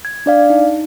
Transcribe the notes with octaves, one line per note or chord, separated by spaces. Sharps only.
G#6
D4 D5 F5
D#4